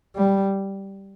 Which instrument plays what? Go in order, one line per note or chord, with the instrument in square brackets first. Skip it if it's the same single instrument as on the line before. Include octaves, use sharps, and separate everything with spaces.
[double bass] G3